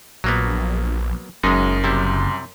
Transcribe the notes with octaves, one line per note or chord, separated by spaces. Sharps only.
A#1 F#3 A#3 B3
F#1 F#2 G#3 D#4
C3 G3 E4